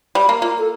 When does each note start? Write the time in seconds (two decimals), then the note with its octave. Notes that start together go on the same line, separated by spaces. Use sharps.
0.15 G3
0.29 A#3
0.42 A#3 F4
0.59 A4